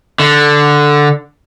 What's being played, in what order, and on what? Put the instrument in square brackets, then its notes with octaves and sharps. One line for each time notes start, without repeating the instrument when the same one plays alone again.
[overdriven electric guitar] D3